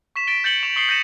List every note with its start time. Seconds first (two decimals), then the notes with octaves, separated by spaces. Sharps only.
0.16 C#6 B6 E7
0.27 A6 B6 D7 G7
0.44 G6 A6 C#7 F#7 G7
0.63 C#6 E7 F7
0.76 C#6 D#6 C7 C#7 G7
0.89 G6 A#6 C#7 D#7 E7